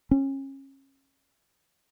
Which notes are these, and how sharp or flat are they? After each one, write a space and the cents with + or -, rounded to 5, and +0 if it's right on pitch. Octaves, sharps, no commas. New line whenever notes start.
C#4 -30